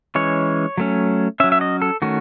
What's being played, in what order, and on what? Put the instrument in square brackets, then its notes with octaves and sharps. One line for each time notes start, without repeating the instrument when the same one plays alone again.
[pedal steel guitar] E3 G#3 C#4 C#5
F#3 A3 C#4
C#4 E5
F#3
E5
D#5
A4
D#3 A3 C#4 F#4